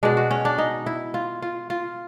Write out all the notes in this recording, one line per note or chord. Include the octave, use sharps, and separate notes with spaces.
B2 G#3 D4
F#4
C#4
D4
D#4
E4
F4
F4
F4